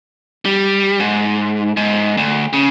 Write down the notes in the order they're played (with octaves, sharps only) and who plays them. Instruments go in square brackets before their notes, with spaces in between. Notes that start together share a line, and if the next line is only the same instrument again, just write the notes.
[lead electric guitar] G3
G#2
G#2
D2
C#3